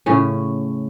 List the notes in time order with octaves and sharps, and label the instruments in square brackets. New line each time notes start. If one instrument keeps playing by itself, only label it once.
[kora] A2 C#3 C#4